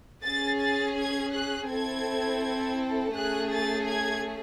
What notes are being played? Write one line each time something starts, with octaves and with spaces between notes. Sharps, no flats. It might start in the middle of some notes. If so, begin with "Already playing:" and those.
C#4 G#4 A6
A6
G#6
F#6
C4 E4 A4 G#6
A3 C#4 G#4 F#6
A6
G#6